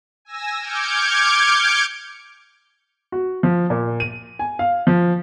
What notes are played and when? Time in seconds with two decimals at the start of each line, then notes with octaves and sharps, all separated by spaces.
0.25 G#5 E6 A#6
0.60 D6 F6 G6 G#6 C#7 D7
3.12 F#4
3.43 F3
3.70 A#2
4.00 D#7
4.39 G#5
4.59 F5
4.87 F3